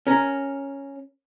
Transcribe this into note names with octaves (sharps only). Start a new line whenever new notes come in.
C#4 A#4